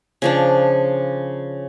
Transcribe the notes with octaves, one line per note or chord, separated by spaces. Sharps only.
C#3 F3 D4